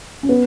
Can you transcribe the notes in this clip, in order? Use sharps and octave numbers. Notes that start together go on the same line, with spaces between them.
C#4
B3